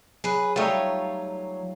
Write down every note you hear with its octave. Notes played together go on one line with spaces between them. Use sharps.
F#3 G#4 B4
G3 A3 D#4 F4 C#5